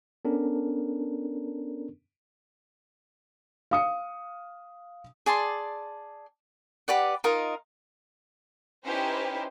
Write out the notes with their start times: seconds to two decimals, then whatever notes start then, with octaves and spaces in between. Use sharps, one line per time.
0.25 B3 C#4 D4 A4 A#4
3.71 F5 D#6 C#7
5.26 G#4 D5 A5 C6
6.88 G4 B4 D5 F#5
7.24 D#4 F4 A#4 D#5
8.84 C#4 D#4 E4 G4 B4 C5